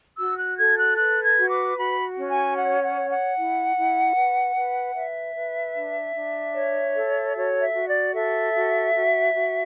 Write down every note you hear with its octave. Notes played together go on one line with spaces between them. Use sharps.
F#4 E6
F#6
A4 G#6
F#6
B4 F#6
G#6
F#4
D6
F#4 B5
C#4
G#5
C#5 F#5
F#5
C#5
F#5
E4
E4
B4
B4
B4 E5
B4
D4
D4
C#5
A4
F#4 C#5
E5
F#4
D5
A4 E5
F#4
F#4
F#4